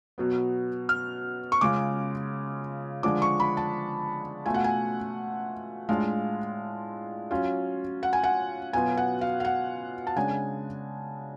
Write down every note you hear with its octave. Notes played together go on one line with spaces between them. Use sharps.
B2 F#3 B3
F6
C#6
C#3 G#3 C#4 F4 D6
D3 F3 G#3 D4 D6
C#6
B5
A5
B2 A3 F4 G#5
F#5
G#5
A2 G#3 D4 F4 F5
F#3 C#4 F4
F#5
G#5
F#5
B2 F#3 B3 F4 G#5
F#5
F5
F5
F#5
A5
C#3 G#3 D4 G#5